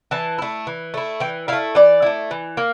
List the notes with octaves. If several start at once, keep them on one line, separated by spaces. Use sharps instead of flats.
E3 A5
A3 E4
E3
A3 E4
E3 G5
A3 E4 F5
E3 D5
A3 E4
E3
A#3